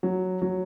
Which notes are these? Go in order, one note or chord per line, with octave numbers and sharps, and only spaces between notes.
F#3
F#3